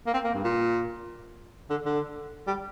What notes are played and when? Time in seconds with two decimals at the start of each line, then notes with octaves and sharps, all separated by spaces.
0.07 A#3
0.14 C4
0.24 A#3
0.34 G2
0.44 A#2
1.70 D3
1.86 D3
2.47 G3